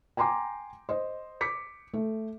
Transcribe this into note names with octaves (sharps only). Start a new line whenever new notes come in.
G5 G#5 A#5 C6 D6
C5 D#5
D6 B6 C#7
A3